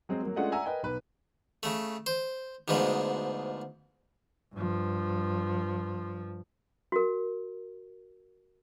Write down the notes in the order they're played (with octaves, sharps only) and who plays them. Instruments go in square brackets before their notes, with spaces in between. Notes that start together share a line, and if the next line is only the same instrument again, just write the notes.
[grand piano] F#3 G#3 C4
F#3 A#3
G#3 A3 C#4 D4 F4 F#5
D5 E5 F#5 G#5 A#5 E6
A#4 B4 D#5 G5 G#5
B1 B4
[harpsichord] C#3 A3
C5
D2 G#2 B2 F3 G#3
[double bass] G2 F3
[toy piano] F#4 A#4